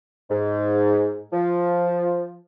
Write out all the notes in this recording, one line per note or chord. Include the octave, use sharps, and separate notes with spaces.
G#2
F3